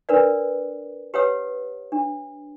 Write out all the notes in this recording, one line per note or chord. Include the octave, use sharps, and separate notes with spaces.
D4 A#4 B4 D5
G4 B4 C#5 F#5 D#6
D4